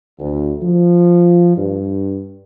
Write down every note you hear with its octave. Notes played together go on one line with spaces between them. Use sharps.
D2
F3
G2